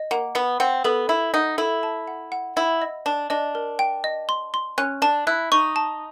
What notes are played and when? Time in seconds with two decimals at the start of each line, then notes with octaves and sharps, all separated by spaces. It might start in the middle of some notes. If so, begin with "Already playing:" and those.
Already playing: D#5
0.11 A#3 F#5
0.35 B3 F#5
0.60 C4 F#5
0.84 B3 A4
1.09 E4 B5
1.34 D#4 F#5
1.58 E4 A4
1.83 A5
2.08 F#5
2.32 F#5
2.56 E4 F#5
2.82 D#5
3.06 D4 A5
3.30 D4 D#5
3.55 A#4
3.79 G5
4.04 D#5
4.29 C6
4.54 C6
4.78 C#4 F#6
5.02 D4 A5
5.27 E4 F#6
5.52 D#4 C#6
5.76 A5